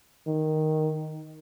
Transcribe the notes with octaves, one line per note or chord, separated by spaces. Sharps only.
D#3